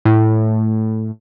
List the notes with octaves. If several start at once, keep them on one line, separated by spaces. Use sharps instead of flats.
A2